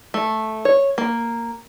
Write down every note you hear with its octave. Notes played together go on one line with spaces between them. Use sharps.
A3
C#5
A#3